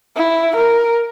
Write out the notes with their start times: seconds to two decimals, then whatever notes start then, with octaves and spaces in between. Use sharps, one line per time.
0.16 E4
0.56 A#4